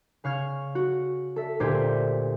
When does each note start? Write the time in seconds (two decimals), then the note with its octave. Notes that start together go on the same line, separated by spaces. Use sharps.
0.24 C#3 F5 C#6 F6 G#6
0.75 F#4
1.36 A4 E5
1.60 D2 A#2 G4 C5 G#6 B6